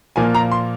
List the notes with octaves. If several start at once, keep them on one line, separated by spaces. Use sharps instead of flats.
A#2 F3 A#3 F4 G#5
A#5
C6